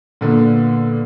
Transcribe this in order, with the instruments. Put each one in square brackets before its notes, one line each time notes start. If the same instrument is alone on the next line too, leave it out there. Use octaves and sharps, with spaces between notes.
[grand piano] A#2 D3 B3